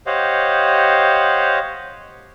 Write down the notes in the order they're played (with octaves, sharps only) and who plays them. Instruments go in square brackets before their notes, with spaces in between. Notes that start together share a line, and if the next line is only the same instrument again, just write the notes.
[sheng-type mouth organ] G4 C5 C#5 D#5 F5 F#5